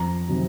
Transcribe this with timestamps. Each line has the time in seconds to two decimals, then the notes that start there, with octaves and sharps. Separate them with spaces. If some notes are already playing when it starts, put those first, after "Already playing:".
Already playing: F2 A#5
0.28 C3 D#3 F#3